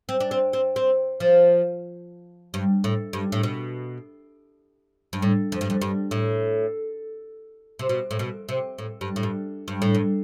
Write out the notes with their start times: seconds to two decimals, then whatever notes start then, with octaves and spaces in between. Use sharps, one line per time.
0.09 C4
0.20 D4
0.31 C4
0.53 C4
0.76 C4
1.20 F3
2.54 G2
2.84 A2
3.13 G2
3.32 A2
3.43 B2
5.13 G2
5.22 A2
5.52 F2
5.61 G2
5.70 F2
5.82 G2
6.11 A2
7.79 C3
7.89 B2
8.11 A2
8.19 B2
8.49 C3
8.78 A2
9.01 G2
9.16 A2
9.23 G2
9.68 G2
9.82 A2
9.95 G2